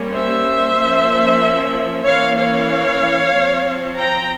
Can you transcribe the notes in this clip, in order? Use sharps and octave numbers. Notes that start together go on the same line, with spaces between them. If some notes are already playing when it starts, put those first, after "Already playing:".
Already playing: G3 A#3 C#4
C5 E5
F3 A#3 C#4
E3 A#3 C#4 C#5 F5
C#5 F5
F3 C4
G5 A#5